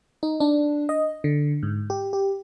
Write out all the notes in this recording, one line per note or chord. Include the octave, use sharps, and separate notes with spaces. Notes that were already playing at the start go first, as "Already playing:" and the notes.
D#4
D4
D#5
D3
G#2
G4
G4